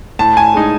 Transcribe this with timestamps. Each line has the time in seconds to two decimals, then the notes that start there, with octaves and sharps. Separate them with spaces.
0.19 A2 A5
0.37 G#5
0.54 G#3 D#4